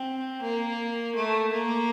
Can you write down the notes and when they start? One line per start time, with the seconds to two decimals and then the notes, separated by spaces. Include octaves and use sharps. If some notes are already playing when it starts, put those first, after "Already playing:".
Already playing: C4
0.42 A#3
1.15 A3
1.52 A#3